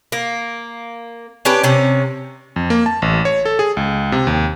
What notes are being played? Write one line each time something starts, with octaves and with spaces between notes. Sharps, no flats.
A#3
C#4 D4 G4 B4
C3 C#4
F2
A#3
A5
A1
C#5
A4
G#4
C#2
C3
D#2